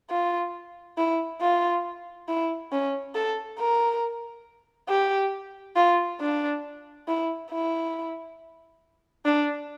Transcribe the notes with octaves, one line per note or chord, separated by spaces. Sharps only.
F4
E4
F4
E4
C#4
A4
A#4
G4
F4
D4
E4
E4
D4